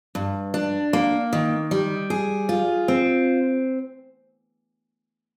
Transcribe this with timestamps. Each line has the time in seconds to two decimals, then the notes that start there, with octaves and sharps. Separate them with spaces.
0.15 G2
0.54 D4
0.93 A#3
1.33 D#3
1.71 G3
2.10 G#4
2.49 F4
2.88 C4